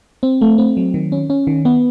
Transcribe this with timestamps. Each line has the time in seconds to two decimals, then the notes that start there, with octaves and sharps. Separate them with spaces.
0.23 C4
0.41 A3
0.58 C4
0.77 F#3
0.94 D#3
1.12 C#4
1.30 C#4
1.47 D#3
1.65 B3